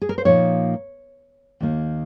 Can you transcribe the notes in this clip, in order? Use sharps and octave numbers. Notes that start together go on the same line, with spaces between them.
G#4
A#4
C5
A#2 F3 A#3 D#4 C#5
D#2 D#3 A#3